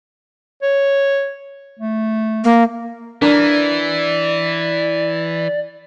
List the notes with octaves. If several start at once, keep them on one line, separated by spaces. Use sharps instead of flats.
C#5
A3
A#3
E3 D4 A#4 D5